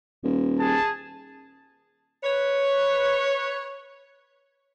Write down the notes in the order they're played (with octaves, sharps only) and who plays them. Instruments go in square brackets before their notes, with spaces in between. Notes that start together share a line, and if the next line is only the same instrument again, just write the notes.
[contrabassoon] D#1
[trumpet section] G#4 A5
[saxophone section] B4 C#5